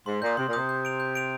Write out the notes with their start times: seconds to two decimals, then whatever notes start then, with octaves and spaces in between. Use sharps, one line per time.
0.06 G#2 C6
0.22 A#2 D#6 G6
0.37 C3 C6
0.48 A#2
0.53 C3 D#6 G6
0.69 G6
0.85 D7 F7
1.00 G6
1.15 D7 F7